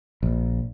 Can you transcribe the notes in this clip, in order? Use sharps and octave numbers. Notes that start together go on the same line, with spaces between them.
A#1